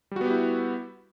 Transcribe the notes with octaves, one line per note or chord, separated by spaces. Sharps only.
G3 B3 E4 F#4 G4